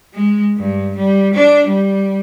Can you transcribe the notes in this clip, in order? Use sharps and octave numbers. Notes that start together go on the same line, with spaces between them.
G#3
G2
G3
D4
G3